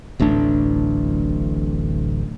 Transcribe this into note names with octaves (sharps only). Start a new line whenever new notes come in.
D1 A1 A3 D4